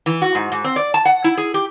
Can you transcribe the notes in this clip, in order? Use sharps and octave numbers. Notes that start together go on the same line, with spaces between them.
E3
F#4
G#2
G#2
C4
D5
A5
F#5
E4
G#4
G4